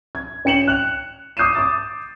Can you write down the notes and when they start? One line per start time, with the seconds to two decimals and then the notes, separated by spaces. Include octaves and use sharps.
0.15 G#6
0.45 C#4 G5 C#7 E7 F#7
0.68 F#6 F7
1.37 D6 D#6 G6 C7 D#7 E7
1.55 D6 D#6 A6